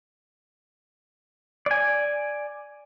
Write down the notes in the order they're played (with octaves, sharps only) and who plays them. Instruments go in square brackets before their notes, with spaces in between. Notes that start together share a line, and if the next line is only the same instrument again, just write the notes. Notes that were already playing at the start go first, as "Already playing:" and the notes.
[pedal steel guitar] D5 G#5